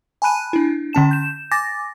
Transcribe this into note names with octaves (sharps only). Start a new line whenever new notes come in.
G#5 A5 B5 F#6 D#7
D4 E4
D3 C#4 A5 E7
G6 E7
G#5 D6 A6 A#6